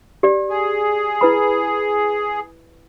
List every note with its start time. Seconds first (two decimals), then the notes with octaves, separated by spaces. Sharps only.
0.23 G4 D5
0.50 G#4
1.21 E4 B4 B5